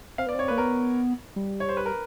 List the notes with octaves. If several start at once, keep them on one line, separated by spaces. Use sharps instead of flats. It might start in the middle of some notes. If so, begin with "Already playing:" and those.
C4 F5
B3 D5
C4 C#5
A#3 B4
B3 A#4
G3
C#5
C5
B4
A#4